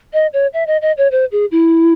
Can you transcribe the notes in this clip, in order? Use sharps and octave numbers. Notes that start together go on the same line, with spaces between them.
D#5
C#5
E5
D#5
D#5
C#5
C5
G#4
E4